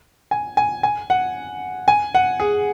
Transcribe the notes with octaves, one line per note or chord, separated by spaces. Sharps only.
G#5
G#5
G#5
F#5
G#5
F#5
G#4